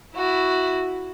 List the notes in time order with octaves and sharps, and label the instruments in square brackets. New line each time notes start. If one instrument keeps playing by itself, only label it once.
[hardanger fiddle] E4 F#4